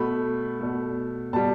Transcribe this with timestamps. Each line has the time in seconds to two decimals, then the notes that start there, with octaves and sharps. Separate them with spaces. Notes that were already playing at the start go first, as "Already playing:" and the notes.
Already playing: B2 A3 B5
0.60 B2 A3
1.33 B2 G3 A5